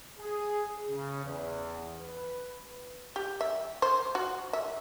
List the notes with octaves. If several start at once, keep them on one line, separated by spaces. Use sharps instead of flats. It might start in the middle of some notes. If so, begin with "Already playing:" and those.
G#4
C#3
E2
B4
G4
E5
C5
F#4
E5